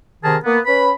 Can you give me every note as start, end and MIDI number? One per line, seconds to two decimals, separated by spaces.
0.23 0.36 48
0.23 0.36 51
0.23 0.36 68
0.23 0.36 70
0.23 0.36 81
0.44 0.58 58
0.44 0.58 59
0.65 0.90 61
0.65 0.90 71
0.65 0.90 83